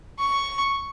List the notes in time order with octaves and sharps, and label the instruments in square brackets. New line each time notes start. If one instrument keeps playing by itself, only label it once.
[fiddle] C#6